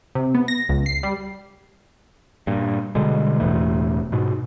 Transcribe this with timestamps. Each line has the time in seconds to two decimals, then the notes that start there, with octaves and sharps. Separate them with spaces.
0.15 C3
0.35 B3
0.48 A#6
0.69 C#2
0.86 C7
1.03 G3
2.47 G2 A#2
2.95 B2 D3 G3 G#3
3.40 E1 A1 E2 A3
4.12 G#2 B2